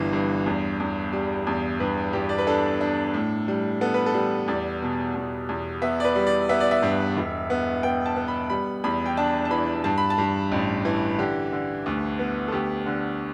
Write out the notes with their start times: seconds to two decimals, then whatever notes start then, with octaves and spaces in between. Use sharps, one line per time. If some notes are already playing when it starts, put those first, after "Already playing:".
Already playing: G1 G2 E3
0.13 G2
0.46 E2
0.80 E2
1.13 G3
1.47 E2
1.80 G2 B4
2.13 G2 G4
2.29 D5
2.38 B4
2.47 D4 A4
2.81 D4
3.14 A2
3.48 G3
3.81 B3 A4
3.94 B4
4.06 A4
4.14 G3
4.48 E2 D5
4.82 B2
5.15 E2
5.49 E2
5.82 B3 E5
6.00 D5
6.04 B4
6.15 G3
6.27 D5
6.49 B3 E5
6.60 D5
6.71 E5
6.82 G2
7.17 E1
7.50 B3
7.83 B3 G5
8.06 A5
8.16 B3
8.28 B5
8.50 G3 B5
8.84 E2 B5
9.06 G5
9.17 D4 A5
9.45 A5
9.51 E3 B5
9.84 G2 A5
9.98 B5
10.10 A5
10.18 G2
10.52 A1
10.85 E3
11.18 D3 G4
11.52 D3
11.86 D2
12.19 B3
12.48 A4
12.52 D2 G4
12.86 D3